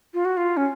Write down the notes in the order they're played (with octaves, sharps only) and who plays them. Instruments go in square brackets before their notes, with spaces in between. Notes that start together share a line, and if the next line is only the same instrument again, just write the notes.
[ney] F4
F#4
F4
C#4